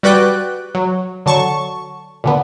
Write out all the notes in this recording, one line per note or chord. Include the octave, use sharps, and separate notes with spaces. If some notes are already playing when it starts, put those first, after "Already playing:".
G3 F#4 B4 D5 G5 F#6
F#3
D3 F#3 A5 C#6
A#2 D3 B3